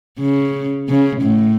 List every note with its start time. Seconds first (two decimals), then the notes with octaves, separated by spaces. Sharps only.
0.19 C#3
0.89 C#3
1.22 A2